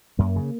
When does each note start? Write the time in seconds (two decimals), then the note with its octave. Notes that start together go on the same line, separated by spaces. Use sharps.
0.19 F#2 A#3
0.36 C#3